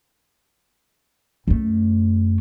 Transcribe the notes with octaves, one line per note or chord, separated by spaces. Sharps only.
F#2 A3